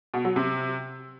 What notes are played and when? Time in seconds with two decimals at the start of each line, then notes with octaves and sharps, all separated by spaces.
0.14 B2
0.25 F#3
0.36 C3